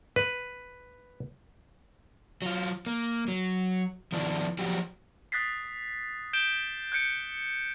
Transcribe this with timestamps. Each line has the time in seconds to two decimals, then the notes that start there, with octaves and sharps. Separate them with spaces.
0.16 B4
2.42 F#3 F4
2.86 A#3
3.28 F#3
4.12 D#3 F3 B3 D4 E4
4.59 F3 F#3 F#4 G4 G5
5.32 D#6 F#6 A6 B6 C7
6.33 G6 D7 E7 G7
6.92 F#6 G6 C#7 D7